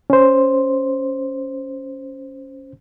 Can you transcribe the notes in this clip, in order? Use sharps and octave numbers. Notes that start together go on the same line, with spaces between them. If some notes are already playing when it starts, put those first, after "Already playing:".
C#4 C5